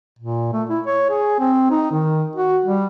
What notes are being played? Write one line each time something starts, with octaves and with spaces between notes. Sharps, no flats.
A#2
A3
E4
C#5
G#4
C4
D#4
D#3
F#4
G3